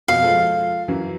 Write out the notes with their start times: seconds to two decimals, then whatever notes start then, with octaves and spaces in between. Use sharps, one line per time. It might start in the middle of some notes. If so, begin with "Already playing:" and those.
0.08 F2 B2 F5
0.22 F3 G#3 A4
0.88 F#2 E3 F#3